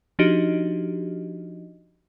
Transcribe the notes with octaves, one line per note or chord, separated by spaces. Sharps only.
F3 D4 D#4 F#4 G4 D#5